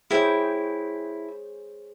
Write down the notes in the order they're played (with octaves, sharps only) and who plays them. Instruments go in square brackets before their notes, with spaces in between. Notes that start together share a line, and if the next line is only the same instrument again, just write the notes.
[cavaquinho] E4 G5 [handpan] G#4 C5 C#5